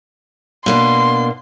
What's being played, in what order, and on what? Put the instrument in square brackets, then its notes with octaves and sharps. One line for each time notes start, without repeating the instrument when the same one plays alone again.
[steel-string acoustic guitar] B2 A#3 D4 [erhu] C6